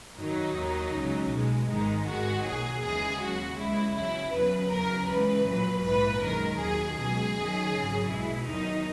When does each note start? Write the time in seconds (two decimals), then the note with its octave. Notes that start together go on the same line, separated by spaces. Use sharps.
0.18 F#2 D#3 F#3 D#4
0.56 D#2 D#3 F#3
0.94 C#2 C#3 F#3
1.31 B1 B2 G#3
1.68 G#1 G#2 D#3 G#3 D#4
2.06 G#1 G#2 D#3 G#3 F#4
2.44 B1 A#2 F#3 G#4
2.82 D#2 C#3 E3 G#3 G#4
3.19 D#2 C#3 F#3 F#4
3.57 C#2 C#3 G#3 E4
3.95 E2 C#3 F#3 E4
4.32 E2 C#3 F#3 B4
4.69 E2 C#3 F#3 A#4
5.07 C#2 C#3 E3 G#3 B4
5.45 A#1 A#2 F#3
5.82 A#1 G#2 E3 B4
6.20 F#2 D#3 G#3 A#4
6.58 D#2 D#3 F#3 G#4
6.95 C#2 B2 F#3 G#4
7.33 F#2 D#3 F#3
7.70 G#1 F#2 C#3 F#3
8.08 B1 B2 G#3 E4
8.46 E2 D#3 F#3 D#4